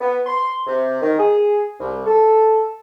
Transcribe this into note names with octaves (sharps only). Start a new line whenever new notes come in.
B3
C6
C3
D#3
G#4
C2
A4